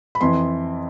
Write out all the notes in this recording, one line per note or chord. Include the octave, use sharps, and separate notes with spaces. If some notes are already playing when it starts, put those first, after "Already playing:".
B5
F2 E3 C6